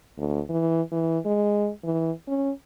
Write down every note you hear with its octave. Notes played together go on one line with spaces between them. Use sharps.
D2
E3
E3
G#3
E3
C#4